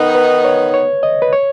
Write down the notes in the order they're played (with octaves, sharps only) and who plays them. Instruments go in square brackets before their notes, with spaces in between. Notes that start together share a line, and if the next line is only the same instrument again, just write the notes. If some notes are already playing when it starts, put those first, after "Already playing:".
Already playing: [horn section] D#3 B3 D#4
[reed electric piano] B4
C#5
C#5
D#5
B4
C#5